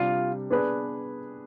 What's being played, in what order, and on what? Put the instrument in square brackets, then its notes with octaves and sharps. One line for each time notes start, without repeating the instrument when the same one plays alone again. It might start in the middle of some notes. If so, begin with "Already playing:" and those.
Already playing: [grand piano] C3 G3 D4 [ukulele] F4
[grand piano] B3 D4 G#4 B4